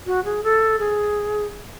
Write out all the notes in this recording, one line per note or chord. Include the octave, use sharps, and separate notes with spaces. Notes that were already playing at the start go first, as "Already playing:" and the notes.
F#4
G#4
A4
G#4